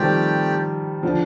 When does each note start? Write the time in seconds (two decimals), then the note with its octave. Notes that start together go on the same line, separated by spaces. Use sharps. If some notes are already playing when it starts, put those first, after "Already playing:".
Already playing: D#3 F3 G3 A3 C4 G4 D5 G5
1.03 D3 F3